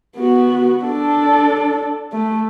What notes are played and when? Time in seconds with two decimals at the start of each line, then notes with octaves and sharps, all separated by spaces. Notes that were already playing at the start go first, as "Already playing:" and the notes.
0.17 B3 F#4
0.84 D4 A4
2.12 A3